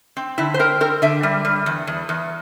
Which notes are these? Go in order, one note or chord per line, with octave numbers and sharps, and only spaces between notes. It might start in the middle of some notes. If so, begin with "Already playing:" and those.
C4
D3 E4
C5
C4 A#4
C4 A#4
D3 E5
G3
G3
E2
E2
E2